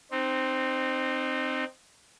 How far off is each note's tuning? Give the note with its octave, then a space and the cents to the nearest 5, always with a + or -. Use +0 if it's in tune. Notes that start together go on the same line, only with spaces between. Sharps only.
C4 +0 D#4 -30